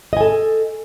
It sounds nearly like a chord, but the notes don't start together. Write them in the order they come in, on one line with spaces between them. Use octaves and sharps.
D#5 G#5 A4